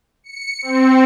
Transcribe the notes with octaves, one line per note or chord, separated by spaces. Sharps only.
C#7
C4